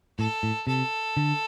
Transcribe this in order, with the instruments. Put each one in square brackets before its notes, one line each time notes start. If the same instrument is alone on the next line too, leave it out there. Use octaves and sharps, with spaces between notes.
[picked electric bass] A2 [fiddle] A4
[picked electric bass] A2
[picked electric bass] C3 [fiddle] A4
[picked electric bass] D3